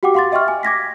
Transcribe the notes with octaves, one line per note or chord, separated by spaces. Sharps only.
F#4 G4 F#5 G5 D6
F5 F#5 C6 D6 A6
D#5 E5 G5 C6 C#6 F6
G#5
D6 G#6 A#6 B6